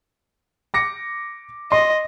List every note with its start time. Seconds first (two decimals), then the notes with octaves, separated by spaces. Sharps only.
0.74 D6 A#6 C#7
1.72 D#5 C6